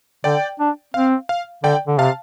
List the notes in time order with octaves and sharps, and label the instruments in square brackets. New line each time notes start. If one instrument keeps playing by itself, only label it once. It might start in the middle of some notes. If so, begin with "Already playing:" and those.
[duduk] D3 [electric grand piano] D5 G5
[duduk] D4
[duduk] C4 [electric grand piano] F5
[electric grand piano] F5
[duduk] D3 [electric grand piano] D5 G5
[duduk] D3
[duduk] C3 [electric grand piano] F5 A5